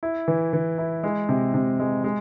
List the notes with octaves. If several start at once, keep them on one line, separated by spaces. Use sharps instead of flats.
E4
E3
E3
E4
G#3
C3
C3
G#3
G#3